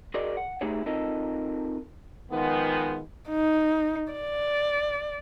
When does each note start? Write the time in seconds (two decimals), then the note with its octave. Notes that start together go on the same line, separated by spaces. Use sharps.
0.14 F#4 G#4 A#4 D5 D#5 C6
0.37 F#5
0.61 A3 D#4 E4 G4 G#4 C#5
0.86 C4 D#4 F4 A4 A#4 D#5
2.32 D#3 F3 G#3 B3
3.29 D#4
4.14 D5